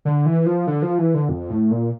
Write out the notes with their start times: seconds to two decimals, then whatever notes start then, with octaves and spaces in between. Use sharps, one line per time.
0.05 D3
0.26 E3
0.46 F3
0.67 D3
0.82 F3
0.98 E3
1.14 D3
1.29 F2
1.50 A2
1.71 A#2